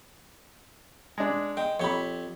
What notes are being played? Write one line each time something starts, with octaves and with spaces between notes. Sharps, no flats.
G#3 D4
G#3 G5
F2 G4 C#5 B5